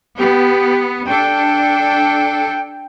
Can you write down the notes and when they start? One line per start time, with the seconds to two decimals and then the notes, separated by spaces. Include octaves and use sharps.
0.18 B3 G4
1.07 D4 A4 G5